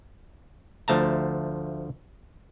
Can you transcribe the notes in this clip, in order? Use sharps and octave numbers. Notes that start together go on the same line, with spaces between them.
D2 F3 A3 A5 A#5